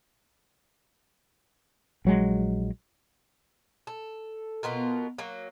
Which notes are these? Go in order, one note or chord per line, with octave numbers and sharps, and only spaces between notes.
A#1 F#3 G#3
A4
B2 B3 F4 A#4
F#3 A#3